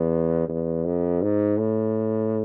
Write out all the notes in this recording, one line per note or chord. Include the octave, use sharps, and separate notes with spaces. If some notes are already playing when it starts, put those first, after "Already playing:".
Already playing: E2
E2
F2
G#2
A2